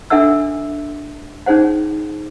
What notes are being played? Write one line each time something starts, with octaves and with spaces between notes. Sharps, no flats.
D4 A4 E5 F#5 E6
C#4 D#4 G#4 C5 F#5